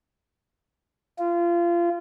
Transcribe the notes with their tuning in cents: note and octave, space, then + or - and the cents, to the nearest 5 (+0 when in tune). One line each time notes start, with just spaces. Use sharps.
F4 -25